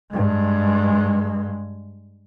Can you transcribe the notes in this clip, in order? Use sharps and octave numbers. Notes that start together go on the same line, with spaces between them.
G2 G#3